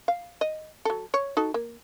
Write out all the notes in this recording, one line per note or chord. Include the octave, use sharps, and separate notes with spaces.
F5
D#5
F#3 A4
C#5
D#4 F#4 A4
A#3